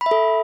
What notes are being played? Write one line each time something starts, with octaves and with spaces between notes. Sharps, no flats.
B5
E5
A4